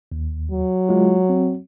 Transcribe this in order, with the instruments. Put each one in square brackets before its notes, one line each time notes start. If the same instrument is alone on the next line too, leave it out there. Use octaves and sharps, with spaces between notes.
[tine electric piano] D#2
[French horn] F#3
[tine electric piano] G#3 F4
C4